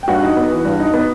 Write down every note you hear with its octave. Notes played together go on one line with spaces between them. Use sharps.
G5
G2 F#4 F#5
D#4
B3
E3
G2
D#4
B3